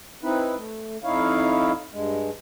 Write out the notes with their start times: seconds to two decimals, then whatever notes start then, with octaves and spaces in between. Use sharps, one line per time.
0.23 C4 D#4 E4 B4
0.57 A3
1.04 F2 D#4 E4 C#5 F5
1.93 G2 G#3